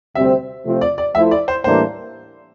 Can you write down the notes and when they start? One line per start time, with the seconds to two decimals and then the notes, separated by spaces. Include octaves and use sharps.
0.15 D2 C3 G3 C4 E5
0.65 C3 F3 A3 C4 F4
0.81 D5
0.98 D5
1.14 F3 A3 E4 A4 C5 E5
1.31 D5
1.48 C5
1.64 A2 E3 G3 A#3 D4 C5